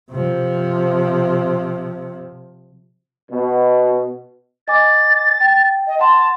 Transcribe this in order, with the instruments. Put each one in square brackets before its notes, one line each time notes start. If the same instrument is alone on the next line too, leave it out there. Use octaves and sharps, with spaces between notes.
[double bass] C3 F3
[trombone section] B2
[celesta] D#5 G#5 D6 [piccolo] A6
[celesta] G5
[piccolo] D#5
[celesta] F#5 C6 [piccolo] A5